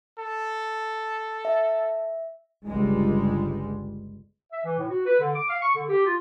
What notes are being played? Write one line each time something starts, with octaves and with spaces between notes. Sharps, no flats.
A4
E5
G1 C#2 G3 G#3
E5
E3
A2
F#4
B4
D3
D6
F5
C#6
D3
G4
F4